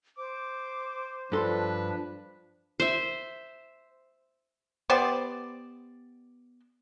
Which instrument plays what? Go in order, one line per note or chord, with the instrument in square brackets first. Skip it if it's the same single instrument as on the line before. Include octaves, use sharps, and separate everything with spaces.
[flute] C5 [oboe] D6
[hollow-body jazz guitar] G2 A4 C6 [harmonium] F3 D4 [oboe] B4
[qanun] C5 E5
[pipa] B3 G4 C5 D5